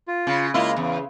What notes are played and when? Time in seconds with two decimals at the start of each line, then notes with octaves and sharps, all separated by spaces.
0.08 F4
0.27 C#3
0.54 C#3 G#3 A#3 E4 F4
0.76 E2 C#3